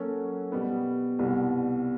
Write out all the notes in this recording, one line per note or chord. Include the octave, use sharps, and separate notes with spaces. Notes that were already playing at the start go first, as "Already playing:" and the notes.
Already playing: F#3 A#3 C#4 F#4 A4
B2 G3 B3
C2 B2 G3 B3